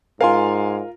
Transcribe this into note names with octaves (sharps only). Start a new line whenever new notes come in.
G#2 F4 A#4 F5 G#5 C6